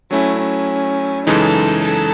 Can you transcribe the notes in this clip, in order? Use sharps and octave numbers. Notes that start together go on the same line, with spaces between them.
F#3 A3 C#4 E4
C#4
F#2 C#3 E3 G#3 D#4 A4
A4